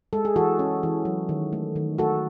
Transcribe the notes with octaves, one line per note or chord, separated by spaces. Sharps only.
G#3 A4
G#4
E3 F#4 A4
C#4
E3
F#3
D#3
A3
D#3
A3 F#4 A4